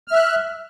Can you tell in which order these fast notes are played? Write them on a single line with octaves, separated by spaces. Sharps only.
F6 E5 F#6